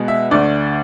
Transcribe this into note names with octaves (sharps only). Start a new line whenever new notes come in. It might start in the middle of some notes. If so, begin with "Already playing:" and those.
Already playing: B2 G#3 B3
E5
D2 D3 A3 D4 D5